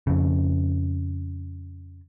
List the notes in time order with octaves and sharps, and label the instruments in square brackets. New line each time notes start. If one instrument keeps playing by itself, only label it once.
[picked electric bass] F2 C#3